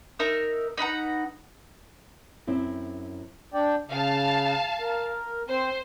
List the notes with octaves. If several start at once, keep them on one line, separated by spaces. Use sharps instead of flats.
D#4 A#4 E5 D#6
D#4 B4 F#5 A#5
F#2 C4 E4
D4 D5 G5
C#3 F5 A5
A#4
C4 C5